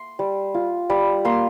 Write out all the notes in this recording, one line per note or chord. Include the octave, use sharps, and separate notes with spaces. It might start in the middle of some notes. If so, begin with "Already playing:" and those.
Already playing: C6
G3
F4
G3
A#3 C6